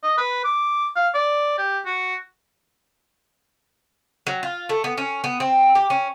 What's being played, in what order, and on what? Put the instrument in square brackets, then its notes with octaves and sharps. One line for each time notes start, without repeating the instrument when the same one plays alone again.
[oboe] D#5
B4
D6
F5
D5
G4
F#4
[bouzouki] F#3
F4
A3
B3
C#4
B3
C4
G4
C#4